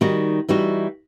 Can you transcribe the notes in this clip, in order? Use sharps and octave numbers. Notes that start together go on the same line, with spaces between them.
D#3 G3 D#4 F#4
E3 G3 D#4 F#4